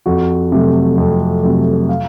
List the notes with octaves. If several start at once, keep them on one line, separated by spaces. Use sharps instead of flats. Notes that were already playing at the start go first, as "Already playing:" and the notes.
F2 F#4
C3 F#3 A3
F2
C3 F#3 A3
F5